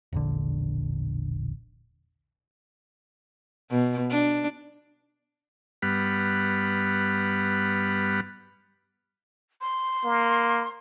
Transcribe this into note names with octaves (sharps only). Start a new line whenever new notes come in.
E1 A#1 D3
B2
D4
G2 G3 B3 F#5 B5 F6
C6
A#3